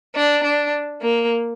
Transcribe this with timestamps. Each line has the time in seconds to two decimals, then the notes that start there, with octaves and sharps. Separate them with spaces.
0.16 D4
0.43 D4
1.02 A#3